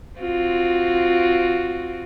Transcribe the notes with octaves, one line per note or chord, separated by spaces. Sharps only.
C4 F4 F#4